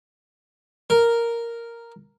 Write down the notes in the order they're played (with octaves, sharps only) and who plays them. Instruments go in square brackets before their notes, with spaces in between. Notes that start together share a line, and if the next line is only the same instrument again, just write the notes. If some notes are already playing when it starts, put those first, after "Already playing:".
[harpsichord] A#4